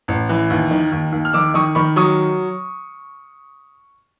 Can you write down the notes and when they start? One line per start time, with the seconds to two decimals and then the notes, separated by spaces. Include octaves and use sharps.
0.08 A1
0.29 E3
0.50 D#2
0.71 D#3
0.92 D#2
1.12 D#2
1.25 F6
1.33 D#3 D6 E6
1.54 D#3 C#6 D#6
1.75 D#3 B5 C#6
1.96 F#3 C#6 D#6